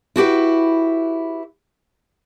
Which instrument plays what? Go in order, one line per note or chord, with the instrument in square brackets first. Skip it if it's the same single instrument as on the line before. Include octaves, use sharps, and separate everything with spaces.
[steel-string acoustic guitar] E4 F#4 G4 B4